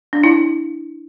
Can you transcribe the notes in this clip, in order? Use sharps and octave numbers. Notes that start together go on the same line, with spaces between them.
D4
E4